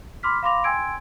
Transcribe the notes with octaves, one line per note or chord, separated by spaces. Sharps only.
B5 C6 D6 F6 B6
F5 B5 C6 D6 A#6 F7
G5 G#5 C6 E6 G#6 D7